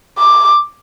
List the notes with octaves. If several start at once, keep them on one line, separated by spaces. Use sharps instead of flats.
D6